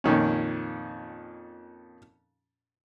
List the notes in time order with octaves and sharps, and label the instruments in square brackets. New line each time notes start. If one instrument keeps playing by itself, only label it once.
[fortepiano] F2 A#2 D#3 C#4